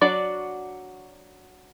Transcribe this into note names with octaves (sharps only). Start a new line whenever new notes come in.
F#3 D4 F#4 D5